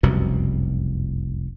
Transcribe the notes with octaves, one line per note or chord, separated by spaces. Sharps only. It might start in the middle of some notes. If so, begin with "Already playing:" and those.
F1 C2 F#2 B2